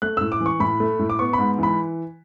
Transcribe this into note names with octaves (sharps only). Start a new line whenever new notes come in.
A3 F#6
A2 E6
D6
E3
C#6
A2 B5
A3
A2
D6
B3 C#6
G#2 B5
E3 B5